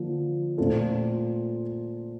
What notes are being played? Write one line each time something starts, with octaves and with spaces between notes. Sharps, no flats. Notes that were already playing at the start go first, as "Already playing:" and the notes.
Already playing: D3 F3 A#3 F4
A#2 A3 C4 F4 A4